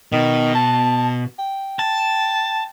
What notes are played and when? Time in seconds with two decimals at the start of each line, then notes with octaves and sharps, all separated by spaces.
0.12 B2 D#3
0.55 A5
1.39 G5
1.79 A5